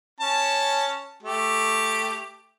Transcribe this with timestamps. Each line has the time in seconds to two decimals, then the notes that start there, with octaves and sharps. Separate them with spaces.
0.20 C#4 A5
1.23 A3 G4